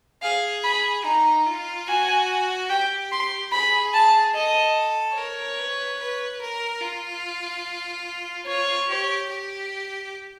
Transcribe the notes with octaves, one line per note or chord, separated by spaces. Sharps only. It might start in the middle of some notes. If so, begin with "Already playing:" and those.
G#4 F5
B5
D#4 A#5
F4
F#4 G#5
G4 G5
C6
G#4 B5
A5
A4 D#5
A#4 C#5
B4
B4
A#4
F4
F4 C#5
G4
G4